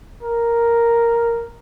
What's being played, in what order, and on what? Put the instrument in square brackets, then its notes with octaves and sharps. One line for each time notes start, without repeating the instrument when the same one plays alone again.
[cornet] A#4